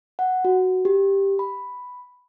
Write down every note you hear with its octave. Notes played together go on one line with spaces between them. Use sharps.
F#5
F#4
G4
B5